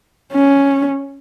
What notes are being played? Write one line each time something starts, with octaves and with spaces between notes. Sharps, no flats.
C#4